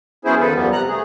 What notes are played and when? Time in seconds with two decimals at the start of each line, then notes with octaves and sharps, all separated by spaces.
0.25 F#3 B3 C#4 E4 G#4 C5
0.40 E2 D#3 F3 A4 B4
0.55 F#2 F3 G3 B3
0.72 C3 A#5 F#6
0.88 A3 G#4